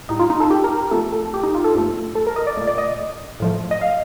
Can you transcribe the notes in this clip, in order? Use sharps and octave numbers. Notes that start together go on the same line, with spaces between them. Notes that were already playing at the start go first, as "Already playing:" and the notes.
A2 G3 D#4
F4
D#4
A4
G4
A#4
A#4
C3 F3 A3 A4
A4
G4
D#4
F4
A4
G2 F3 A3
A4
A#4
D#5
D5
A#2 A3
D5
D#5
A2 F3 A3
D#5
F5